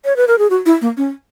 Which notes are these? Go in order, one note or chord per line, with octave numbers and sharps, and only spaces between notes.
C#5
B4
A#4
G#4
F#4
E4
A#3
C#4